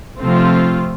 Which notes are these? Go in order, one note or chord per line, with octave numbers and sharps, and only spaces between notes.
C3 F3 A3 C4 F4